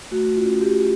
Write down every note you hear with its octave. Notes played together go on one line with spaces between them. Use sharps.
A3 F#4
C#4 F4
A3 G4